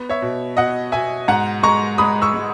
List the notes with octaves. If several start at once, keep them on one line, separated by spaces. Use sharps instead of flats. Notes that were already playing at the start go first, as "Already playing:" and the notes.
Already playing: B3
C#5 E5
B2
B2 D#5 F#5
B2 E5 G#5
G#2 F#5 A#5
G#3 A#5 C#6
G#3 B5 D#6
C#6 E6
G#3